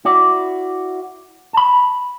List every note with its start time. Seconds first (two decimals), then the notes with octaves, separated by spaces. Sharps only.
0.05 E4 F#4 D5
1.53 A5 B5